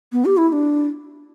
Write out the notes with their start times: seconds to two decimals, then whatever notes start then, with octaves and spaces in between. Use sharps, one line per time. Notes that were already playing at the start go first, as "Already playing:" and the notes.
0.13 B3
0.25 G4
0.37 E4
0.49 E4
0.52 D4